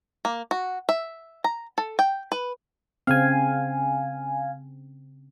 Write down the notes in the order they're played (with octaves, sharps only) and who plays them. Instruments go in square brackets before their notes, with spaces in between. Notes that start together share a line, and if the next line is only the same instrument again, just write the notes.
[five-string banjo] A#3
F#4
E5
A#5
A4
G5
B4
[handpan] C#3 C4 [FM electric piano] F5 G#5